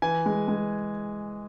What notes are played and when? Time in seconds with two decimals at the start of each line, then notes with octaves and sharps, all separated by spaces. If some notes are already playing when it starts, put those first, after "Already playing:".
0.02 E3 G#5
0.26 G#3
0.48 G#3